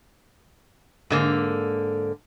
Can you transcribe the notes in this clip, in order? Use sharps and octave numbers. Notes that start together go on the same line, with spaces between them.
G#2 D3 A#3